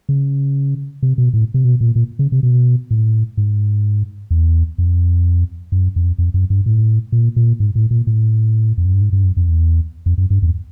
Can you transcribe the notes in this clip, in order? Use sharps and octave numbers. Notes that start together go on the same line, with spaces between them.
C#3
C3
B2
A2
C3
B2
A#2
A#2
C#3
C3
B2
A2
G#2
E2
F2
F#2
F2
F2
F#2
G2
A2
A#2
A#2
G#2
A2
A#2
A2
F2
F#2
G2
G#2
G2
F#2
F2
E2
F2
F#2
G2
E2